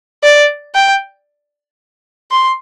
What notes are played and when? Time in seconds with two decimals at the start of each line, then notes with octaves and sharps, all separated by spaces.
0.23 D5
0.75 G5
2.31 C6